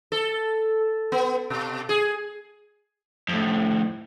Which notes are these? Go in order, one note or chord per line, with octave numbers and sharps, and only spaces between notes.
A4
B3
B2
G#4
F2 A2